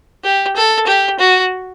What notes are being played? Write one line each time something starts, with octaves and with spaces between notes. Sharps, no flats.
G4
A4
G4
F#4